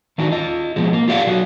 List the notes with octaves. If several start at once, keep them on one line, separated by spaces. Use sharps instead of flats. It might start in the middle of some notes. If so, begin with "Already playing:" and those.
D#3 D4 D#4 F#4
F4 D#5
B2 F3 G#3
A#3
F4 G4 D5 F5 F#5
B2 F#3 F#4